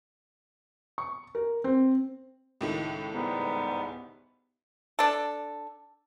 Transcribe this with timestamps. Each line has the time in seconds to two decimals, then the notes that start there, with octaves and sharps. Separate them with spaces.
0.98 C#6
1.35 A#4
1.64 C4
2.61 C#2 A2 D#3
3.13 G#2 G3 B3
4.99 D4 A4